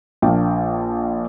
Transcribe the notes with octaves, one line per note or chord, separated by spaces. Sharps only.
A#1 A#3 D4 G5